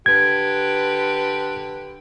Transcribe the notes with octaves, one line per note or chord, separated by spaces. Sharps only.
D3 G4 B4 G#6